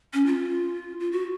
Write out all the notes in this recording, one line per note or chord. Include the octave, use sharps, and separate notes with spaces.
C#4
F4
F4
F#4